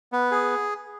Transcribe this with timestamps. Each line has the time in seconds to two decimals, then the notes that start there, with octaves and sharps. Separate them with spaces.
0.12 B3
0.31 G#4